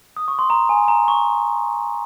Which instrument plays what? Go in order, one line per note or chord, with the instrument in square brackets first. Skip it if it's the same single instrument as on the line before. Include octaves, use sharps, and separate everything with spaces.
[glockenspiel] D#6
C#6
C6
A#5
G#5
A#5
C#6